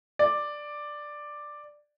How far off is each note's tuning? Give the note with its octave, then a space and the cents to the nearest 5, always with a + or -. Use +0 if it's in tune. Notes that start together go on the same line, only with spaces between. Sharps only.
D5 +5